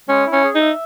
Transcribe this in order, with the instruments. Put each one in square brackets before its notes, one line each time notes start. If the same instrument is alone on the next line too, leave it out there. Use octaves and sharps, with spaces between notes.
[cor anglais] G#3 [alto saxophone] C#4
[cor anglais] E4
[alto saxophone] C#4
[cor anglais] G#4
[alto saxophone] D#4
[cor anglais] E5